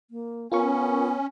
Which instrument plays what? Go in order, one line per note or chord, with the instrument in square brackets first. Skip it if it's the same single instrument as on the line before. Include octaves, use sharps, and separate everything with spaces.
[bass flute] A#3
[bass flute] B3 [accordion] C#4 [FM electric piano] F4 A#4 C#6